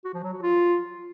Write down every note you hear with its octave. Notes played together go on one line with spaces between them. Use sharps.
F#4
F3
F#3
F#4
F4